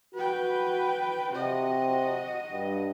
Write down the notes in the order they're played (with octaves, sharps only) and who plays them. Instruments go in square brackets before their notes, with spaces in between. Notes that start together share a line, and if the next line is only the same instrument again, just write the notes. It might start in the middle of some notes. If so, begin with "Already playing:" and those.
[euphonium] F#4 [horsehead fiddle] B4 G5
[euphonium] C3 [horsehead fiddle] F#4 D#5
[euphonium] G2